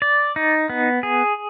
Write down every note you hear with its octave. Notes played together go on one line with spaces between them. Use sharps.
D5
D#4
B3
G#4